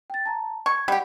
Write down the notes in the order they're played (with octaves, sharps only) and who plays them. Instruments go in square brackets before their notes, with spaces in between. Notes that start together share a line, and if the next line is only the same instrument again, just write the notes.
[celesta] G5 A6
A5 A#5
[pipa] C#6 [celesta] G#6
[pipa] G3 G4 [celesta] F#5 B5